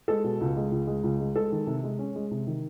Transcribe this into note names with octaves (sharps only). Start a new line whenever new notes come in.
G#3 A4
B2
C#2
G#3
C#2
G#3
C#2
G#3
G#3 A4
D#3
C3
G#3
C#4
G#3
C3
D#3